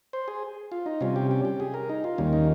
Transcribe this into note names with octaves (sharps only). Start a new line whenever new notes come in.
C5
G#4
F4
D#4
C3 G3 C#4 F4
G4
G4
G4
G#4
A#4
D#4
F4
D#2 D#3 G3 A#3 C#4
D#4